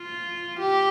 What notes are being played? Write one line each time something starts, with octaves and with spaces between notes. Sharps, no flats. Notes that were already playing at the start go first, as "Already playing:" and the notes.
Already playing: F4
G4